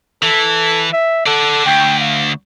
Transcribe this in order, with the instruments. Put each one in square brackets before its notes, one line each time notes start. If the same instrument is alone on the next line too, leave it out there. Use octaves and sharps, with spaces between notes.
[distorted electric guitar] E3 [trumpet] A4
[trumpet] E5
[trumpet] A4 [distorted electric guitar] D5 F#5
[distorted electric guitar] D2 [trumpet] G5
[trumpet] F5